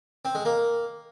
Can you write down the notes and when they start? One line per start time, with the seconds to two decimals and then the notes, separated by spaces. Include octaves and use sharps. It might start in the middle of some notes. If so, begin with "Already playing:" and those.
0.25 C4
0.35 G#3
0.45 A#3